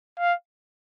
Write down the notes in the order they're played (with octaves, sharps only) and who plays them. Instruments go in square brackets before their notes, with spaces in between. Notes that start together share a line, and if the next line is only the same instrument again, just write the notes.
[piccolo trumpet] F5